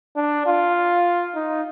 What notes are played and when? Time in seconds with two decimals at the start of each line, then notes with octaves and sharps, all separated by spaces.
0.16 D4
0.46 F4
1.35 D#4